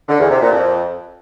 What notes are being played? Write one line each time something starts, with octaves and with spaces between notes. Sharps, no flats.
D3
E2
C3
A#2
F2